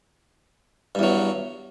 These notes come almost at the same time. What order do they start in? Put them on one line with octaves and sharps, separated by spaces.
G2 E2 F#3